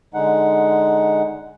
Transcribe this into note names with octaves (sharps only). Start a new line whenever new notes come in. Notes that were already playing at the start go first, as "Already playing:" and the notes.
D3 G#3 D#4 F#5